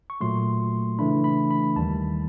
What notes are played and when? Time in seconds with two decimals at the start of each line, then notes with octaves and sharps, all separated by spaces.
0.10 C#6
0.21 A#2 F#3 A3 C6
0.99 C#3 E3 A3 D4 B5
1.24 B5
1.51 B5
1.76 D#2 D#3 G3 A5